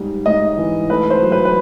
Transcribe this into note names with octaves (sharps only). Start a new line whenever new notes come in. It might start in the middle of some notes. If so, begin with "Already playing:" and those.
Already playing: G#2 G3
G#2 D#5
E3
A3 B4
C5
F#3
B4
B4